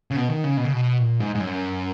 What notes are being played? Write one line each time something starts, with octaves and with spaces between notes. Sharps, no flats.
C#3
B2
D#3
C#3
B2
C#3
B2
A#2
G#2
G#2
F#2